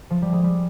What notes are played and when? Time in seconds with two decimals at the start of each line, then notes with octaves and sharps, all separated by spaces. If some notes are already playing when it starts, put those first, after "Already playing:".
0.10 F3
0.22 G3
0.33 G#3
0.44 G3